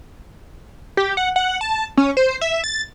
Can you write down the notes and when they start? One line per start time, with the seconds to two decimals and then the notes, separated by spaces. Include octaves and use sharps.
0.97 G4
1.17 F#5
1.36 F#5
1.61 A5
1.97 C#4
2.17 C5
2.41 E5
2.64 A6